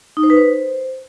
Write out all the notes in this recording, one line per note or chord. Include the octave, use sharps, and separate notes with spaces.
D#4
C5
B4
C5